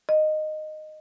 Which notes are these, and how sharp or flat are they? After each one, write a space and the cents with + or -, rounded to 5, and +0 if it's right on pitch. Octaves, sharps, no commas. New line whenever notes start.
D#5 -10